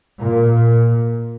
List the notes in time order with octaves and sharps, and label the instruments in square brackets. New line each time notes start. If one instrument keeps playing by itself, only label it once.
[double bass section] A#2